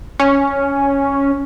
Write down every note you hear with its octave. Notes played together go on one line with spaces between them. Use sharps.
C#4